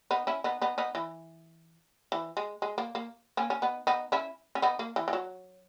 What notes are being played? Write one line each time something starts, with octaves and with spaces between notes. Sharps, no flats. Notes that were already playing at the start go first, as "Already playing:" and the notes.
B3 D#4
C#4 E4
B3 D#4
B3 D#4
B3 D#4
E3
E3
G#3
G#3
A#3
A#3
A#3 C#4
C#4
B3 D#4
B3 D#4
C#4 E4
C#4
B3 D#4
A#3
E3
E3
F#3